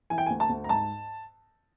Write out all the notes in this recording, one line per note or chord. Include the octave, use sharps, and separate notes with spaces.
E3 G#5
G5
G#5
D2
A5
D2
A#5
G#2 A5